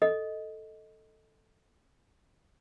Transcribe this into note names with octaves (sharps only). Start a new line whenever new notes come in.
A4 D#5